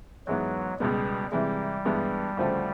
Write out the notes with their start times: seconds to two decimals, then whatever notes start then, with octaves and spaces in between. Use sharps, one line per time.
0.27 G#2 E3 F#3 G#3 B3
0.80 C#2 B2 G3 G#3 B3
1.32 C3 E3 G3 G#3
1.85 G2 E3 G#3 B3
2.37 D2 C#3 F3 A3 C4